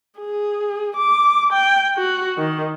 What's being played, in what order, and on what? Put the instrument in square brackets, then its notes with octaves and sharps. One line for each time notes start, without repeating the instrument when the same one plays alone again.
[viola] G#4
D6
G5
F#4
D#3